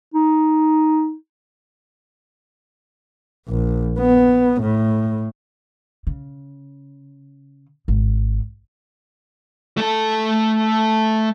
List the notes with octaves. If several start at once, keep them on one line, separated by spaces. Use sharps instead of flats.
D#4
A#1
B3
A2
C#3
G#1
A3 A4